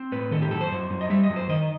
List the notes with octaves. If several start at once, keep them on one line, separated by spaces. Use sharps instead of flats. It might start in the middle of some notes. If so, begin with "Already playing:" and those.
Already playing: C4
A2 B4
D#3 A4
G4
F#2 A4
C5
F#2
F#2
D#5
G3 E5
D#5
F#2
C5
D#3 D#5